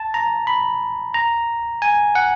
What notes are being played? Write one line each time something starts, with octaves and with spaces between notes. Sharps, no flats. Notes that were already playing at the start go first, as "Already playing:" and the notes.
Already playing: A5
A#5
B5
A#5
G#5
F#5